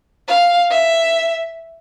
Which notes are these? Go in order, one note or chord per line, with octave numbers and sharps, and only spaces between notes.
F5
E5